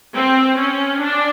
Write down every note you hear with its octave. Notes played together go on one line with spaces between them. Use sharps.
C4
C#4
D4